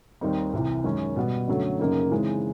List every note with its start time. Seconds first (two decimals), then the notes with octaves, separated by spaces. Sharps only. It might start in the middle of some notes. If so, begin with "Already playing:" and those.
0.21 D#2 D#3 G3 C4 D#4
0.53 C2 C3 E3
0.84 F#2 D#3 G#3 C#4
1.16 B2 G3 B3
1.48 F#2 D3 F#3 A3
1.80 F#2 C#3 F#3 A#3 D#4
2.11 C#3 E3 G#3 C4 D#4